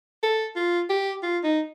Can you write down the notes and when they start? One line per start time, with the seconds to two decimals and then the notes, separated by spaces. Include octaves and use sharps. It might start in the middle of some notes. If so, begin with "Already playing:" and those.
0.23 A4
0.56 F4
0.90 G4
1.23 F4
1.44 D#4